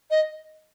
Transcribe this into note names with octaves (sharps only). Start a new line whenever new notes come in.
D#5